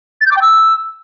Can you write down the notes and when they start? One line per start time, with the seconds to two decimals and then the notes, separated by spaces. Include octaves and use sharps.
0.21 A6
0.26 G6
0.31 D6
0.36 G5
0.41 E6